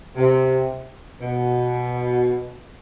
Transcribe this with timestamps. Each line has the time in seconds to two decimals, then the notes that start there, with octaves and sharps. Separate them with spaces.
0.16 C3
1.21 B2